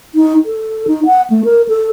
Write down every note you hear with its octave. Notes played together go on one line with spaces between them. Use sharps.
D#4
A4
D#4
F#5
A3
A#4
A4